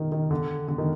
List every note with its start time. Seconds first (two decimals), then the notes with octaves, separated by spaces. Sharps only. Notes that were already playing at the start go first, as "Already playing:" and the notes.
Already playing: D#3
0.12 D#3
0.31 D3
0.68 D3
0.78 D#3